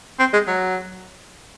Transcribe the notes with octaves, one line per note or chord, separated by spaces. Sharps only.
C4
G#3
F#3